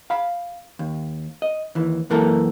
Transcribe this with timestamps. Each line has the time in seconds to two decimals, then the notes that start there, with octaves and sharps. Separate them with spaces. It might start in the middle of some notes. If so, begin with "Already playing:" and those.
0.10 F5 B5
0.79 D#2
1.42 D#5
1.75 D#2 E3
2.10 C#2 F#2 E3 A#3 A4 A#4